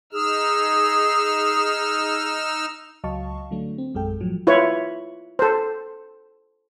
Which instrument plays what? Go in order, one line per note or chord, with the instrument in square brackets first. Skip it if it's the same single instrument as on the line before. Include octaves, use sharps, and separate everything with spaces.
[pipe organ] D#4 E6 F6 [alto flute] G#4
[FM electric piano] C#2 F#3 D#5 F5 A5 C#6
D3 F#3 A3 D4
C4
A#1 F#2 G#3 A4 G5
A2 F3 F#3
[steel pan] E4 F4 B4 C#5
A4 C5